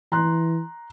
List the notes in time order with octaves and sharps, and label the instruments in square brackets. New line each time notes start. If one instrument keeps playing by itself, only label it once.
[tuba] E3 [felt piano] A#5 C6 F#6